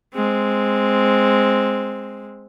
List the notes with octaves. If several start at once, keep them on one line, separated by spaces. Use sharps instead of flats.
G#3 C4